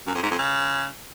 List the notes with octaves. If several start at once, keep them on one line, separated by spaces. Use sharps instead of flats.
F#2
F2
G#2
F2
C#3